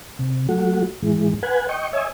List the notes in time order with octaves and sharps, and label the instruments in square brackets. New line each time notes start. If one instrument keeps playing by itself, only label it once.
[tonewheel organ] C3
F#3 A3 F#4
G#2 E3 G#3
B4 F#5 G#5
D#5 G5 C#6
C#5 D#5 E5 G#5